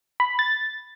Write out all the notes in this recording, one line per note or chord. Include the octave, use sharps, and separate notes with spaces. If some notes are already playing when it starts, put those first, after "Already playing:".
B5
A6